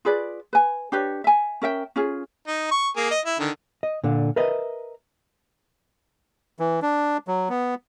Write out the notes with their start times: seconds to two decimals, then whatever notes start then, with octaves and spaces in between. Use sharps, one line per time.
0.05 F4 G#4 B4 D5
0.53 B4 G#5
0.92 D4 G4 B4 C#5
1.24 E5 G#5
1.62 C#4 A#4 E5 G5
1.96 C#4 F4 G#4
2.48 D#4
2.72 C#6
2.96 A#3 G#4
3.11 D#5
3.25 E4
3.39 D3 D#3
3.83 D#5
4.04 A#2 D3
4.36 A#4 B4 D#5 E5
6.59 E3
6.82 D4
7.28 F#3
7.49 B3